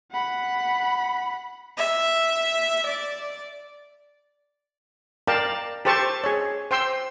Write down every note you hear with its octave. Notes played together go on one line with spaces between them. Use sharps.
F#5 B5
E5
D5
A#4 D5 F5 G5 A5
G4 A4 C5 A5 C#6
G#4 C#5
C5 G5 C6 E6